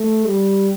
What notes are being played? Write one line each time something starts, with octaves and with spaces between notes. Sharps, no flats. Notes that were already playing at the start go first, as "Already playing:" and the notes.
Already playing: A3
G3